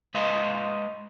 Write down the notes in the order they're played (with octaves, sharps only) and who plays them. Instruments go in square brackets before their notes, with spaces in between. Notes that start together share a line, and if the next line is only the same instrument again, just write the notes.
[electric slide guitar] G#3 B4 C5 D#5 F5